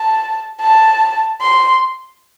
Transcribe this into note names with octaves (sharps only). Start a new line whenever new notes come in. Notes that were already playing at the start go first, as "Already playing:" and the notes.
Already playing: A5
A5
C6